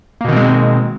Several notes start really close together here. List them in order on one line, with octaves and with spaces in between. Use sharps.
A#3 B2 D#3 C4 G#3